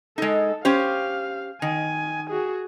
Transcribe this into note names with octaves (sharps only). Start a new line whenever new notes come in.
G#3 D#4 A4
C#4 G4 C5 F5
D#3 G#5
F#4 G#4